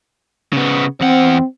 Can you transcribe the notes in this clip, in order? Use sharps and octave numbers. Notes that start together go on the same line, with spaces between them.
C#3 B3
E2 C4 F#5